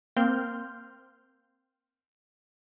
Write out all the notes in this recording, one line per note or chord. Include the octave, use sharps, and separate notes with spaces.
A#3 C4 C6 F6 G6